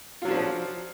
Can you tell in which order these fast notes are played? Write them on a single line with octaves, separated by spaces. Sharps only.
F4 F#3 D4 F3